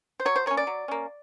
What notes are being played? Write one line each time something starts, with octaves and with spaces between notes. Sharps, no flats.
C5
F#3 C#5
C5
A#3 C#4 C#5
D5
F#3
A#3 C#4